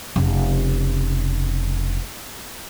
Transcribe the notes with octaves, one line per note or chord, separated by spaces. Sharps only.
F1 C#3